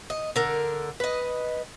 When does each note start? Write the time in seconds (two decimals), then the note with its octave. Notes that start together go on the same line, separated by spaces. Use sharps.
0.10 D#5
0.36 D3 A#4
1.00 B4 D#5